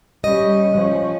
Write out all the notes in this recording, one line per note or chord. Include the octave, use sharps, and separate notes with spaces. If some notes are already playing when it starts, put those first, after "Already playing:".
G3 C#4 D#5
F3 C#4